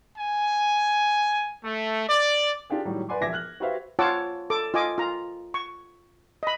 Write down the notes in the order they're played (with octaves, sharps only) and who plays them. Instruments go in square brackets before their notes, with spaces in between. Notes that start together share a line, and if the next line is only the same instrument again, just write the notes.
[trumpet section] G#5
A3
D5
[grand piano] D4 F4 G4 G#4
A2 D#3 F#3 G3
B4 D5 F#5 G#5 C6 D6
E1 A#1 E5 D6 G#6 A#6
F6 F#6 F#7
F#4 G4 B4 C5 E5 F5
[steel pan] F4 C#5 F#5 A5 D6 E6
A4 D6
F4 D#5 G#5 D6
F4 A#5
C#6
D#5 B5